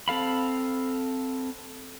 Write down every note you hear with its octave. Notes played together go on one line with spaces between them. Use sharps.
C4 A4 F5 B5